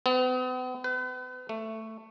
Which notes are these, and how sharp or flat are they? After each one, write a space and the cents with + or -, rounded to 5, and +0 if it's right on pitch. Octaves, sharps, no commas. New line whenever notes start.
B3 +45
B4 +40
A3 +10